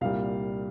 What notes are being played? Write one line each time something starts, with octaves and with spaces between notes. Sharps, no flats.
C2 A#2 G3 F5